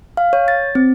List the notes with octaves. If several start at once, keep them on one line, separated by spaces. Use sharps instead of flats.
F5
C#5
A6
C4